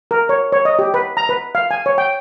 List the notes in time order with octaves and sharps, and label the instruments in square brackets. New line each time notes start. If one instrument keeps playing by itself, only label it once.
[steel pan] A#4
C#5
C#5
D#5
G4
B4
A#5
B4
F5
G#5
C#5
G5